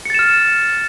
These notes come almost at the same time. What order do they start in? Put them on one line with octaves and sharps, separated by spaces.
C#7 A6 E7 F6